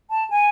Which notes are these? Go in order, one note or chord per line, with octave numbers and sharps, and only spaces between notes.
A5
G#5